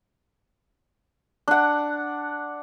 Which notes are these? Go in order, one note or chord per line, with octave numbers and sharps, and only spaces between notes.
D4 F#5